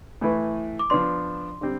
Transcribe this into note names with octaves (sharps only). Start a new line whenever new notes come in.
A2 E3 A3 E4 B4
D6
F3 B3 D4 C6
D3 G3 C4